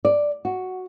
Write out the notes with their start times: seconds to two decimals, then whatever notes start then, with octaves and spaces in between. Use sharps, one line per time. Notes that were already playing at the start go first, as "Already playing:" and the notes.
0.05 D5
0.45 F#4